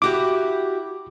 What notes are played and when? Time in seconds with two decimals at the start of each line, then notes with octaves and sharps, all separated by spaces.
0.02 E4 F#4 G4 D6